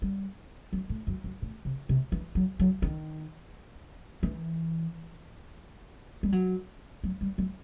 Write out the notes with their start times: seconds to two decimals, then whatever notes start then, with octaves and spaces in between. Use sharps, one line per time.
0.02 G3
0.73 F#3
0.89 A2
1.07 F#2
1.24 F#2
1.42 A2
1.65 C3
1.89 C3
2.12 E3
2.35 F#3
2.59 F#3
2.82 D#3
4.23 E3
6.23 G3
6.32 F#3
7.04 F#3
7.21 G3
7.38 F#3